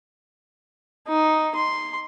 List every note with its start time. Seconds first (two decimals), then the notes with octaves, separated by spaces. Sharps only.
1.08 D#4
1.55 C6